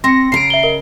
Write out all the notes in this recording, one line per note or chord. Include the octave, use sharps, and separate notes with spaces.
C4 C6 A#6 C#7
C#3 A#5 C7 D7
E5 G7
A#4 D#5 G7